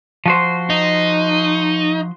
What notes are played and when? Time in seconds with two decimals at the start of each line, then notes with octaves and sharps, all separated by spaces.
0.26 F3 F#4 C5
0.70 D#4